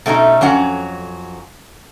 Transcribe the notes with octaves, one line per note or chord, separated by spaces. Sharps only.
B2 A3 C#4 D#4
F2 F#3 C#4 F#5